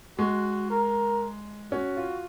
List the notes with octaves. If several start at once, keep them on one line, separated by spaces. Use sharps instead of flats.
G#3 F#4
A#4
C#4 F#4
F4